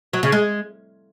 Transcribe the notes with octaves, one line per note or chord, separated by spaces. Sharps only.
F#3
C#3
G#3